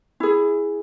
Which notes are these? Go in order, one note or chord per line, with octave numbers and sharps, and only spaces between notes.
E4 G#4